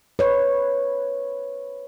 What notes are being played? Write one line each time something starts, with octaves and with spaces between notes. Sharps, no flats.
B4 C#5